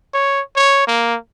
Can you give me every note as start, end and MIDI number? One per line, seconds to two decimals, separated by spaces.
0.14 0.41 73
0.56 0.87 73
0.87 1.17 58